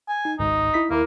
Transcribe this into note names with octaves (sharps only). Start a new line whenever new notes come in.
G#5
D#4
G#1 C#2 G#2 D#4
E4 B6
D#2 A#3 E4 A#4